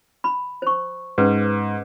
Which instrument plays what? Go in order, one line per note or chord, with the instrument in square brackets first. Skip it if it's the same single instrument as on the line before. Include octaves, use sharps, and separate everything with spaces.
[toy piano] B5
C5 C#6
[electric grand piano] G#2 [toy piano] C#4 B4